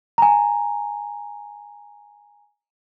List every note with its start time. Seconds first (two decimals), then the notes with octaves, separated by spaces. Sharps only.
0.18 G#5 A#5